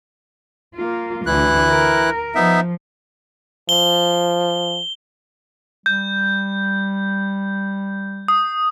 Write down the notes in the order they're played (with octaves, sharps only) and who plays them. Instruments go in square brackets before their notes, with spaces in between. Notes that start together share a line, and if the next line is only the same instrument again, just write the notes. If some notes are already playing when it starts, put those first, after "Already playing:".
[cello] A#3 F4
[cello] D2 D3 [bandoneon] E3 E4 F#6
[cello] A#4
[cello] F3 [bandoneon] B3 D#4 E5
[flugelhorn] F3 [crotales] G7
[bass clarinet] G3 [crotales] G6
[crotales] D#6